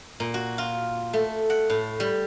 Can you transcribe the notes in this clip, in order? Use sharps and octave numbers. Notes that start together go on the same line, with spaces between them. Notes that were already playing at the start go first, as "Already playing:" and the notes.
A#2
F#4
F4
A3
F#5
A2
G3